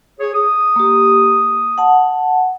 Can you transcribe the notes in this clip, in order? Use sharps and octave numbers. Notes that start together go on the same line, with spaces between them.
G#4 C#5
D#6
A#3 G4
F#5 A5